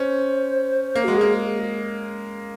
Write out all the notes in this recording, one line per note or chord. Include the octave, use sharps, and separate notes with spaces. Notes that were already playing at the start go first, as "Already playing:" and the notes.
Already playing: C#4 C5
A#3
G#3 F#4
A#3 G#4